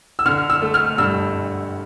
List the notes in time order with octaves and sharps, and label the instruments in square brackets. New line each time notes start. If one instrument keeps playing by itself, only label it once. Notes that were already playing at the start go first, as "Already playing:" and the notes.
[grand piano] E6
D3 F6
E6
A3
F6
G2 E6